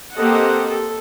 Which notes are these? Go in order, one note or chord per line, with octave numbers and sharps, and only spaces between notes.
A#3 C4 G4 A4 D#5 F#5
A4